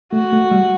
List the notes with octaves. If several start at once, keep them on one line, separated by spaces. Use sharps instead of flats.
A3 F#4
A3
G3